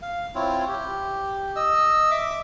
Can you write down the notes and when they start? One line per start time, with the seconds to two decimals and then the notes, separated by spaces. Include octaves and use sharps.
0.02 F5
0.35 C4 E4 F4 C#5
0.68 G4
1.56 D#5 E6
2.11 E5 D6